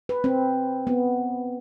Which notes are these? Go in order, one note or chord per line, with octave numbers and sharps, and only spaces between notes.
B4
C4
B3